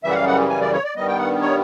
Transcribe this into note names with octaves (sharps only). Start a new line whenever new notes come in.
F#2 C#3 E3 G3 E5
F#5
F5
F#5
G#5
D5
C#5
D5
G2 D#3 G3 B3 D#5
G5
F#5
C#5